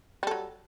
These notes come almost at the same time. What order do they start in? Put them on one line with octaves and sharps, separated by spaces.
G3 A4 F#3